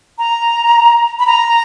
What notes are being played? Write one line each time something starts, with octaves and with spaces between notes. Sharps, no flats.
A#5
B5
A#5